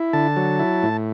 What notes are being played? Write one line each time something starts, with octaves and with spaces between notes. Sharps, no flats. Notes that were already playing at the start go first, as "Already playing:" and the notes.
Already playing: E4
D3 A5
F#3
E4
A2